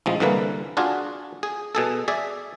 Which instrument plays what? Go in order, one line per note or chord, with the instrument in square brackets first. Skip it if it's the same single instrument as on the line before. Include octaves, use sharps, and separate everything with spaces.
[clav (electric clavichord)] A1 F3 G#3
C2 D3 E3 A#3 B4
D4 F4 F#4 G#4
G#4
B2 G#4 A4
G#4 D5 E5